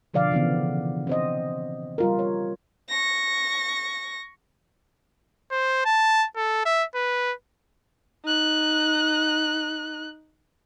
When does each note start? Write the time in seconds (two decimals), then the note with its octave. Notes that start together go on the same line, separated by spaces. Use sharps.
0.14 B2 D3 F3 D5 F5
0.31 C#3 E3 B3
1.07 C4 C5 D#5
1.98 G3 F4 A#4
2.19 C#5
2.89 C#6 A#6
5.51 C5
5.85 A5
6.36 A4
6.66 E5
6.95 B4
8.25 D#4 F#6